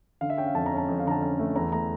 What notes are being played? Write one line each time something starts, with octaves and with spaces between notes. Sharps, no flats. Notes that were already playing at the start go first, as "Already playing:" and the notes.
D3 F5
E5
C#4 G5
F5
F2 A5
A#5
C#4
A5
F2
F5
D3 A#5
A5
C#4
A3
E2 A#5
A3 A#5